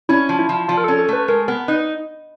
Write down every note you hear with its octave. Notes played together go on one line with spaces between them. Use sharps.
C#4 E4
F3
E4
F3
F3 F4
A#4
C#4 A4
A4
A3 B4
G#3 A#4
B3 A#4
D#4 B4